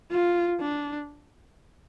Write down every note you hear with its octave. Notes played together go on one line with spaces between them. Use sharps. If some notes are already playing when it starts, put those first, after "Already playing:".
F4
D4